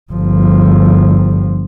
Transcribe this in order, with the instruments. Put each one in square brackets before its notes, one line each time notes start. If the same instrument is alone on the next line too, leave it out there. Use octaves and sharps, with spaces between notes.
[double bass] G1 F3